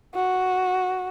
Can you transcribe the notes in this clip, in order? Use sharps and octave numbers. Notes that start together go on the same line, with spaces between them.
F#4